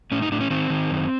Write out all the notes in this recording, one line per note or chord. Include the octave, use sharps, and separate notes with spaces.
A2 C#4
D#4
A2 D4
C#4
D#3 C4
D#3
F#2